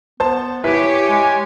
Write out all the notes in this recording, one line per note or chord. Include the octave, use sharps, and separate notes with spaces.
B3 C5 A5
E4 G4 B4 C#5 G#5 B6
G#3 G#5